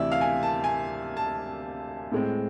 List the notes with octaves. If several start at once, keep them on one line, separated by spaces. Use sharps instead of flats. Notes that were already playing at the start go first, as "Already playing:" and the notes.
Already playing: D2 C3 E3 D5 E5
F5
G#5
A5
G#5
A5
A2 G#3 C4